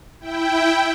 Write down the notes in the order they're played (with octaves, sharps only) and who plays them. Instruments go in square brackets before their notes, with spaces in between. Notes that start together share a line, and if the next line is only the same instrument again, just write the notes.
[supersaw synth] E4 G5